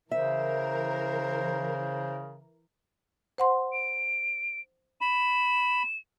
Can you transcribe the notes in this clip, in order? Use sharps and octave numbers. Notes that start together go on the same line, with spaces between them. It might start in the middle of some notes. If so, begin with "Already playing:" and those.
C#3 E3 A#4 C5 E5
C5 F#5 C6
D7
B5 E7